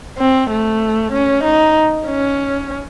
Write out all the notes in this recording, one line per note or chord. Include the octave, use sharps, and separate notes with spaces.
C4
A3
C#4
D#4
C#4